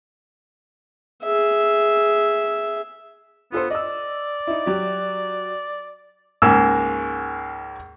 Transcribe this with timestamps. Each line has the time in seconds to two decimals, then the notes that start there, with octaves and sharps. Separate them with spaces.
1.24 G#4 E5
3.52 B3 F4 A4 C5
3.70 D5 D#5 E6
4.47 D#4 E4
4.66 F#3 G4
6.42 C#2 G#2 A#3 E6